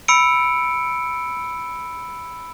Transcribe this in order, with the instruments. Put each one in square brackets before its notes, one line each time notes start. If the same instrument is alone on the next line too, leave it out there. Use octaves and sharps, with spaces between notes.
[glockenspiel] B5 E6 C#7 D7